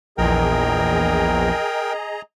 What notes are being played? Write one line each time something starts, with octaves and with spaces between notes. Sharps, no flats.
A#1 E2 G#4 A#4 D#5 G5 A#5